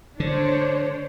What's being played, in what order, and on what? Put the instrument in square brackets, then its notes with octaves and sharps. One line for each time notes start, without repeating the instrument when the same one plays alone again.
[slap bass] D3 [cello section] D4 C5 C#5